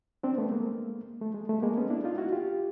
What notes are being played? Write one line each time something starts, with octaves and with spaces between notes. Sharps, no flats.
C4 D4
A3 B3
G#3 A#3
A3
G#3
A3
G#3 A#3
B3 C#4
D4 E4
D#4 F4
E4 F#4
F4 G4